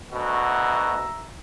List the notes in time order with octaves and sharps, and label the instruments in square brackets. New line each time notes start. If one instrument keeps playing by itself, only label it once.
[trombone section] D2 B2 F#4 [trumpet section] E5 A#5